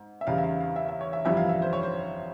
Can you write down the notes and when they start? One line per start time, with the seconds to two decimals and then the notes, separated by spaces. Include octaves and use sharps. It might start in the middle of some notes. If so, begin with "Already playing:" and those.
Already playing: G#2
0.21 E5
0.27 E2 C#3 G3 F5
0.38 E5
0.44 F5
0.60 F5
0.76 E5
0.88 E5
1.01 C#5
1.13 E5
1.25 G1 F2 E3 G3 E5
1.37 F5
1.49 E5
1.62 C5
1.73 C#5
1.83 C5